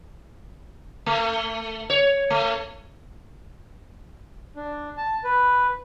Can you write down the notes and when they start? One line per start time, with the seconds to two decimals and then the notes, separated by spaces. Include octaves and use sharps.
1.06 A3
1.90 C#5
2.30 A3
4.56 D4
4.97 A5
5.24 B4